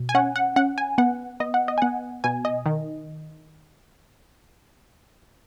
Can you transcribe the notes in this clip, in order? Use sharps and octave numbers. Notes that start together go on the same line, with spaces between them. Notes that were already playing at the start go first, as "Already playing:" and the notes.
Already playing: B2
G#5
C#4 F#5
F#5
C#4 F#5
G#5
B3 F#5
B3 D#5
F#5
D#5
G#5
B3 F#5
B2 G#5
D#5
D#3